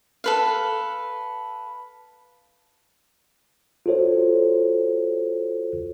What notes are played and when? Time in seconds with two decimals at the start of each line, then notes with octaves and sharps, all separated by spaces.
0.24 A4 B4 F5
3.86 F4 F#4 A4 C5 C#5